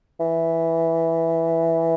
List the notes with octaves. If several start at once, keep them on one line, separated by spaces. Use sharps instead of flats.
E3